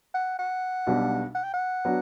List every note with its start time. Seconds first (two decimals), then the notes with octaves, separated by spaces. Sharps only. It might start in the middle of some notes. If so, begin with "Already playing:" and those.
0.14 F#5
0.39 F#5
0.87 B1 B2 G3 D4
1.35 F#5
1.44 G5
1.54 F#5
1.85 F#3 B3 D4